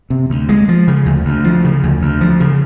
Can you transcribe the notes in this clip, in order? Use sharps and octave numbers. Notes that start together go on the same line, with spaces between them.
C3
D2
G#3
F3
C#3
D2
D2
F3
C#3
D2
D2
F3
C#3